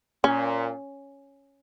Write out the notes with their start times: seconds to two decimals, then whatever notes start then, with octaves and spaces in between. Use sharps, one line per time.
0.23 A#2 C#4